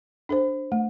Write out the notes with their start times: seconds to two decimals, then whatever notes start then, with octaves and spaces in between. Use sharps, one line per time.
0.29 D4 A4 C5
0.72 A3